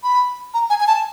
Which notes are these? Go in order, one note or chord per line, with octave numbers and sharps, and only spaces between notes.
B5
A#5
G#5
G#5
A5